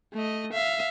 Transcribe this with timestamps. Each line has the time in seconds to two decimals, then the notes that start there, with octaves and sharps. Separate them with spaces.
0.13 A3 D#5
0.53 E5 F5